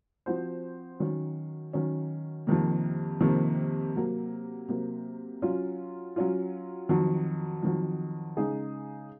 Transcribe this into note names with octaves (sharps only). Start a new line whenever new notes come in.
F3 C4 F#4 C5
D#3 F#3 C#4
D#3 F#3 C#4
F2 C3 D#3 A#3
F2 C3 D#3 A#3
C3 F#3 A#3
C3 F#3 A#3
F#3 C#4 F4
F#3 C#4 F4
F2 D#3 F#3
F2 D#3 F#3
C#3 G#3 D#4 G#4